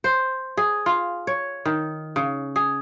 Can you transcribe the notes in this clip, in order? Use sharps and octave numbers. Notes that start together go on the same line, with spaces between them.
C5
G#4
F4
C#5
D#3
C#3
G#4